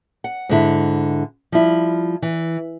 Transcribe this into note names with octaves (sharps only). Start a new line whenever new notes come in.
F#5
G#2 D3 E4
F3 G3 E4 F4
E3